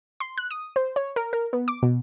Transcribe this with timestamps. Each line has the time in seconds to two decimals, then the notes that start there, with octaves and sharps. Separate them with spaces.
0.20 C6
0.38 F#6
0.51 D#6
0.76 C5
0.96 C#5
1.16 A#4
1.33 A#4
1.53 B3
1.68 D6
1.83 B2